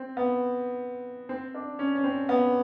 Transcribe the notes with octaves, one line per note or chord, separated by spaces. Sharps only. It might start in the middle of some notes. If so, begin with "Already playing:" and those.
Already playing: C4
B3
C4
D4
C#4
C#4
C4
B3